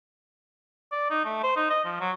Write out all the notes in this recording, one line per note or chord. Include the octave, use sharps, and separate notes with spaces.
D5
D#4
A3
C5
D#4
D#5
F3
F#3